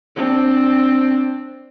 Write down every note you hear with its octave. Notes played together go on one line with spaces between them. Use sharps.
C4 D4